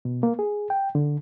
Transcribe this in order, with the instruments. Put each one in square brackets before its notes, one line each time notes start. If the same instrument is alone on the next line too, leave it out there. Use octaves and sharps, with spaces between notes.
[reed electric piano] B2
A#3
G#4
G5
D3